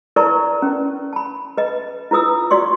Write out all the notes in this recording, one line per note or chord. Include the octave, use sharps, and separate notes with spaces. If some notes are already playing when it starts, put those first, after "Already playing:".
E4 A#4 B4 D5 A5 C#6
C#4 B4
A5 B5
B4 D#5
E4 F4 B4 D#6 E6
F#4 D5 C6 C#6